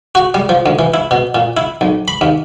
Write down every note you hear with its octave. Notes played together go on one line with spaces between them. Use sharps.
F#4
G3
F3
D2
E3
E4
B2
A#2
E4
B1
B5
D#2